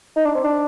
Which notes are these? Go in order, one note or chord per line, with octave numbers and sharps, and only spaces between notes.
D#4
D4
C4
D4